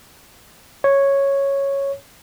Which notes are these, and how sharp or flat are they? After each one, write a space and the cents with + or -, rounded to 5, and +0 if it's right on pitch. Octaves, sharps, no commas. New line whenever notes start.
C#5 -5